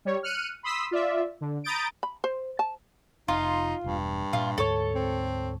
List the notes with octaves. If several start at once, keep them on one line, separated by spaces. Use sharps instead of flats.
G3 C#5
F6 F#6 C#7 D#7
B5 C6 D#6 E6 B6
F4 D5 E5
D3
A#5 B5 D#6 G6 A6 D7
B5
C5
A5
F1 D#4 F4
E1 G2
A#2 G3 F4
D2 G#2 A4 C#5
C4